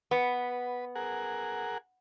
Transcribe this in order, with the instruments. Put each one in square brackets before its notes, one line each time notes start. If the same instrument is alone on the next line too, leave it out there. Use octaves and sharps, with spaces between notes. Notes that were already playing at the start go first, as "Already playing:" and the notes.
[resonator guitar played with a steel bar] B3 [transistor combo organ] B4
[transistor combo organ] G#4 A#4 F#5